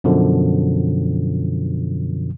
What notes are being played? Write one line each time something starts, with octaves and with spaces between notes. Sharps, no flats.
F#2 B2 D3 F3